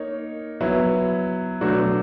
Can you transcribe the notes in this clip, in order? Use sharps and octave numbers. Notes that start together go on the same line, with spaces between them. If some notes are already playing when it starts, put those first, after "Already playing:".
Already playing: A#3 D#4 C#5
F#3 B3 E4
B2 F#3 A3 D4 F#4